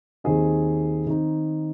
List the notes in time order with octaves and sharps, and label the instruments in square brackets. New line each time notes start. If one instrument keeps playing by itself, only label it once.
[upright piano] D#2 D#3 C4 G#4 D#5
D#3 C4 D#4